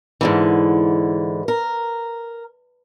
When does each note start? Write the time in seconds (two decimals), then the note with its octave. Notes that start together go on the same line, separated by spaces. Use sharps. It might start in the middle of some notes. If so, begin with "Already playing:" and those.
0.21 G#2 D3 E3
1.48 A#4